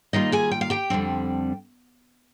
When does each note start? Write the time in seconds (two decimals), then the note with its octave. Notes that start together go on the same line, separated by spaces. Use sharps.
0.13 D#3 G3 A#3 D#4 F4 D#5
0.32 G#4 G#5
0.51 G5
0.61 F5
0.70 G4 G5
0.90 F2 D3 G3 C4